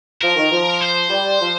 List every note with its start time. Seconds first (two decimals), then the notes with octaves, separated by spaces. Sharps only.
0.22 F3 A#4
0.36 D#3
0.51 F3
0.81 C5
1.10 G3
1.41 F3